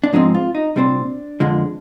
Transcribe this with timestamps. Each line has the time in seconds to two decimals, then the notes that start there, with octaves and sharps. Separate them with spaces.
0.04 D4
0.13 G#2 F3 G#3 C4 D#4
0.34 F4
0.55 D#4
0.76 C2 A#2 G3 C4 D4
1.40 F2 D3 F3 G#3